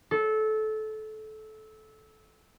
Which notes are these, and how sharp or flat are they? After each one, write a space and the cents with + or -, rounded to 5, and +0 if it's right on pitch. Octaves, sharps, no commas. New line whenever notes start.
A4 -20